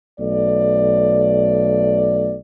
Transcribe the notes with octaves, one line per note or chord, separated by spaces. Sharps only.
B1 A3 D5